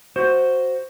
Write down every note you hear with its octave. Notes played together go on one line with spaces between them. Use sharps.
F#4 C5